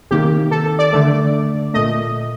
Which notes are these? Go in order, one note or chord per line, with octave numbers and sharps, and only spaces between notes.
C3 D#3 A#3 G4
A4
D5
D3 A3
A#2 A3 D#5